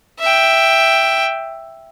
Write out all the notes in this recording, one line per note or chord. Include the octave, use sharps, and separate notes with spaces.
E5 G5